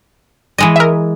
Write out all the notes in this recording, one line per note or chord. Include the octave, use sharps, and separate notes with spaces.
E3 G#3 D#5
A#4 E5